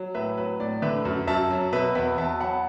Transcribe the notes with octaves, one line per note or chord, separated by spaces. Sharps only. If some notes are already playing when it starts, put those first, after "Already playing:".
Already playing: F#3
A2 B4 E5
F#3 B4
A2 D5
D3 B4 E5
F#2
F#2 E5 A5
F#3
B2 B4 E5
E2 B4 E5
E2 E5 A5
F#3 F#5 B5